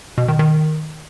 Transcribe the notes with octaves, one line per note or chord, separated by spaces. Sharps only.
B2
D#3
D#3